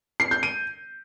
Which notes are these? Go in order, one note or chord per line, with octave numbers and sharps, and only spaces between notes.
C7
G6
D#7